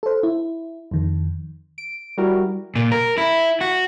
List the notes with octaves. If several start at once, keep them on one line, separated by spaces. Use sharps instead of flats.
A4 C5
E4
F2 D#3
D7
G3 E4 F#4 A#4
A#2
A#4
E4
F#4